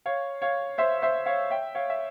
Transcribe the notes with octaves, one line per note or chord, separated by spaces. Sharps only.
C#5 F5
C#5 F5
C5 E5
C5 E5
C#5 F5
E5 G5
C#5 F5
E5